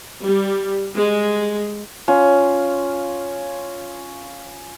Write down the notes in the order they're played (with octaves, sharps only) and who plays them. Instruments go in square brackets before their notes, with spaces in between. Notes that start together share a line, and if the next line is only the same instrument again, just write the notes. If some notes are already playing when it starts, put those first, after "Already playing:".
[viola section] G3
G#3
[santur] C#4 F4